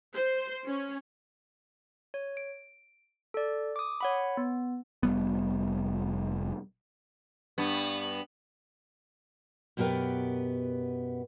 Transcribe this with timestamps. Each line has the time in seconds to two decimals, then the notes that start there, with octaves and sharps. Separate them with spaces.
0.15 C5
0.66 C#4
2.14 C#5
2.37 D7
3.34 A4 D5
3.76 D6 D#6
4.01 C#5 F#5 B5
4.37 B3
5.03 F1 G3 B3
7.58 G2 B3
9.77 F#2 B2 B3 G4 A#4 B4